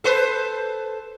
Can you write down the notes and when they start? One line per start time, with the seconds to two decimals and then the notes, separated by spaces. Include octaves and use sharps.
0.04 A4 B4 C5